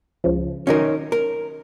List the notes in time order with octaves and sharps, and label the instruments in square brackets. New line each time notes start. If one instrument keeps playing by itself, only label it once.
[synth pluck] C#2 C#3 F3
[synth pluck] D#3 F#3 [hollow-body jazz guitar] C#4 D#4 A#4
[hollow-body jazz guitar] A#4